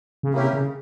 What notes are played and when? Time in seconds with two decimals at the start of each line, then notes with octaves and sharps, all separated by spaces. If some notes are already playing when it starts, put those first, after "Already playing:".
0.23 C#3
0.33 C3 A#3 C#4 E4 G4 A#4
0.53 C#3